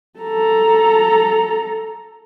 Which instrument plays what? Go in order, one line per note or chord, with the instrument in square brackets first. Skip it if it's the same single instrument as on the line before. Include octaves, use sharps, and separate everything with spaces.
[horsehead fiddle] A4 A#5